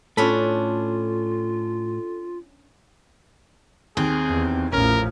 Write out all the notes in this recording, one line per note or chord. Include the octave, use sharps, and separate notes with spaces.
A2 C#4 D4 F4 A4 B5
D#2 C4 G#4
E2
A1 F3 C#4 A#4